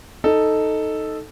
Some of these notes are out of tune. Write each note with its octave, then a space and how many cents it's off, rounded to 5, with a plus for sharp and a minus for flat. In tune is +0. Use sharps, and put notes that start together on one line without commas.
D#4 +0 A4 +0